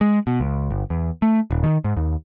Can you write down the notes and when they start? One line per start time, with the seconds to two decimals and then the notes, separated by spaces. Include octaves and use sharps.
0.01 G#3
0.27 B2
0.40 C#2
0.71 G1
0.90 E2
1.22 A3
1.51 D#1
1.64 D#3
1.84 G#2
1.97 D#2